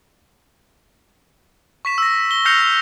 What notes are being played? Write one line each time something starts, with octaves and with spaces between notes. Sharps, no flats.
C#6 B6 E7
E6 A#6
G7
F6 G6 A#6 C7 C#7 F7